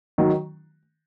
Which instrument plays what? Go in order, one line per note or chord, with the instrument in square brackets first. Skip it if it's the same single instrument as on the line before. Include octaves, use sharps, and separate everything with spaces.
[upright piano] D#3 F#3